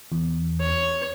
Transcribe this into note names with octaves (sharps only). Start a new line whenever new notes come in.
E2
C#5